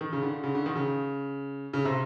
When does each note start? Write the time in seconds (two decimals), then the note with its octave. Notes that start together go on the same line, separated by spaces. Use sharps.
0.01 D#3
0.13 C#3
0.23 D3
0.44 C#3
0.55 D3
0.66 D#3
0.76 C#3
1.73 C#3
1.85 C3